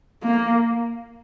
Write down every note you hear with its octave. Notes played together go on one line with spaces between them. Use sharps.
A#3